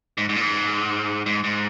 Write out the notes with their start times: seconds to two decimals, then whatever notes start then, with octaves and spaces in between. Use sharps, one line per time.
0.18 G#2
0.29 G#2
0.36 A#2
0.41 G#2
1.26 G#2
1.44 G#2